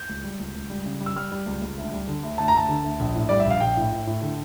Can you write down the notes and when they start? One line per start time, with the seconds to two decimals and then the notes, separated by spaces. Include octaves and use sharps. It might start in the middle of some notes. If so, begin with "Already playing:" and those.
Already playing: G6
0.09 C#2
0.24 G3
0.39 C#2
0.55 C#2
0.70 G3
0.86 C#3
1.00 G3
1.06 E6
1.16 G3 F6
1.32 G3
1.46 C#2
1.62 C#2
1.78 D2
1.92 G3
2.08 D3
2.23 D2
2.38 D2 A5
2.48 A#5
2.54 D2 A5
2.69 D3
2.84 D2
3.00 A#1
3.15 A2
3.29 G3 D5
3.40 E5
3.45 A#1
3.50 F5
3.60 A#1 G5
3.77 A2
3.92 A2
4.07 A2
4.22 D3